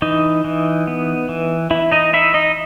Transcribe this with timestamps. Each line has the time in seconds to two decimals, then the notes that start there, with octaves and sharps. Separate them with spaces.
0.02 E3 D#4
0.45 E3
0.87 B3
1.29 E3
1.70 E3 E4
1.92 D#4 D#5
2.13 D#4 E4 E5
2.34 D#4 D#5